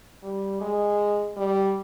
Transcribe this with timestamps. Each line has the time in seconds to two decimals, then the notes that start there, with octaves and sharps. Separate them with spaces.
0.23 G3
0.61 G#3
1.37 G3